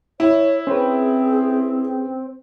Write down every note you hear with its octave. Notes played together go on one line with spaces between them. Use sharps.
E4 C#5
C4 C#4 G#4 B4